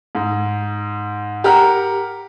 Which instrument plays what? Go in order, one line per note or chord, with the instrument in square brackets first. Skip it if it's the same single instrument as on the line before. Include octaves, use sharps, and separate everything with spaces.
[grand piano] G#2
G4 A#4 F#5 A#5 F6